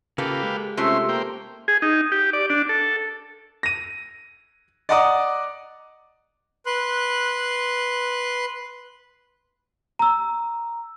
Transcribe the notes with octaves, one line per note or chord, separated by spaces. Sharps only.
C#3 A#3 F4 G4 A4 B4 F5
G#3
C3 A3 C4 C#4 F4 G4 E5 C6
A#3 C5 G5
G#4
D#4
G4
D5
D4
A4
A#6 D#7
D5 D#5 F#5 A#5 D6 D#6
B4 C6 F#6
A#5 E6